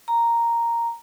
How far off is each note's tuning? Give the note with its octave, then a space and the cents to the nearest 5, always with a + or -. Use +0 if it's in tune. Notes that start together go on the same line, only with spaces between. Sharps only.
A#5 -5